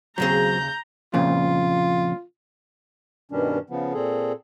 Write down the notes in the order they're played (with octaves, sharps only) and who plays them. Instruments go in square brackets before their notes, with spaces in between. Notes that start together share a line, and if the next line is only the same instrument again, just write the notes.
[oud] D#2 C#3 G#4 [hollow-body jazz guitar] F#3 C4 [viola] A#5 [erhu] G6
[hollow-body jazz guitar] F2 A#2 C#3 [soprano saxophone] F4
[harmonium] G2 B2 D#3 G3 C#4 D4
C#3 F3 B3
A#2 C4 G#4 A4